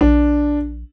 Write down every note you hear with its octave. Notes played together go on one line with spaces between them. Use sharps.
A#1 D4